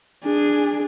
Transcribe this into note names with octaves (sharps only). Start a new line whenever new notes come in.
D4 G#4